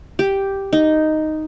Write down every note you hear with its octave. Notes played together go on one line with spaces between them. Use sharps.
G4
D#4